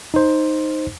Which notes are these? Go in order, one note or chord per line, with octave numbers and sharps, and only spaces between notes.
D#4 C5